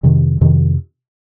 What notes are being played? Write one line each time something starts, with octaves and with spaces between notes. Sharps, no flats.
F2 C3 D#3
F2 C3 D#3